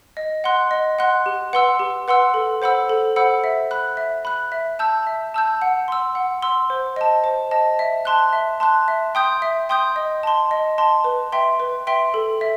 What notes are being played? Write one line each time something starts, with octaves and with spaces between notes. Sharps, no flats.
D#5
F#5 C6 F#6
D#5
F#5 C6 F#6
G4
B4 F#5 C6 E6
G4
B4 F#5 C6 E6
A4
C5 F#5 B5 E6
A4
C5 F#5 B5 E6
E5
B5 F#6
E5
B5 F#6
E5
A5 E6 G6
E5
A5 E6 G6
F#5
C6 E6
F#5
C6 E6
C5
D#5 A5
C5
D#5 A5
E5
A5 C6 F#6
E5
A5 C6 F#6
E5
G5 C6 D#6 G6
E5
G5 C6 D#6 G6
D#5
A5 C6
D#5
A5 C6
B4
E5 G5 C6
B4
E5 G5 C6
A4
E5